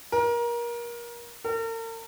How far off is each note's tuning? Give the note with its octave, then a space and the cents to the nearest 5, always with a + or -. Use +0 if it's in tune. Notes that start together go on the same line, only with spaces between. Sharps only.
A#4 +25
A#4 -45